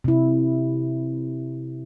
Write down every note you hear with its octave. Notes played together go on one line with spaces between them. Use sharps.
C3 E4